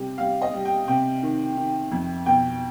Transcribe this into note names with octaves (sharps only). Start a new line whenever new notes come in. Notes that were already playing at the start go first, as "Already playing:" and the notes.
Already playing: C3 G3
G3 F5
D#5
G3
G5
C3 G5
D#3
D#3
F2
B2 G5